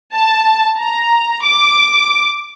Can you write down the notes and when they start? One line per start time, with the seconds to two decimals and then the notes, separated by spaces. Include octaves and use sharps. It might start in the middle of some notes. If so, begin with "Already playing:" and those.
0.14 A5
0.78 A#5
1.42 D6